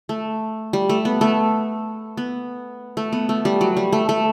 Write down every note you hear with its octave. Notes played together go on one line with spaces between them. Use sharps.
A3
G3
A3
B3
A3
B3
A3
B3
A3
G3
F#3
G3
A3
A3